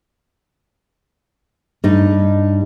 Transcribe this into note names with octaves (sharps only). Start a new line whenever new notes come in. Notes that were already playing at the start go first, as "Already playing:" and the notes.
G2 D#4